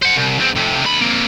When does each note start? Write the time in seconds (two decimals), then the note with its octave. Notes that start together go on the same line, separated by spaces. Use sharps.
0.02 C5 F#5
0.16 C2
0.39 E2 C4
0.56 F2 C3
0.83 D2 B5
1.02 A#3 C4